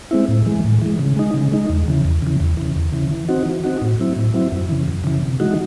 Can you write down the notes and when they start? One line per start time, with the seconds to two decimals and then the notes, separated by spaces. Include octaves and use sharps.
0.11 G#3 C4 E4
0.28 A2
0.46 E3 G#3
0.64 A2
0.81 E3 G#3
0.99 C#3
1.16 G#3 D#4
1.34 C#3
1.52 G#3 D#4
1.70 E2
1.88 C#3 E3
2.05 E2
2.22 C#3 E3
2.40 E2
2.57 C#3 E3
2.75 E2
2.92 C#3 E3
3.11 E3
3.29 C4 D#4 F#4
3.46 E3
3.64 C4 D#4 F#4
3.82 A2
3.99 F#3 C4 E4
4.16 A2
4.34 F#3 C4 E4
4.52 F#2
4.69 C#3 E3
4.88 F#2
5.04 C#3 E3
5.22 C3
5.40 E3 G#3 D#4 F#4